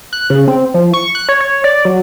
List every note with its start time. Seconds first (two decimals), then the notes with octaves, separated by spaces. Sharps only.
0.13 F#6
0.30 C#3
0.48 C4
0.74 F3
0.94 C#6
1.15 F#6
1.29 C#5
1.40 C#5
1.64 D5
1.85 F#3